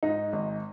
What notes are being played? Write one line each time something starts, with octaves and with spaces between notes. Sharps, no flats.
G#2 D#4
G#1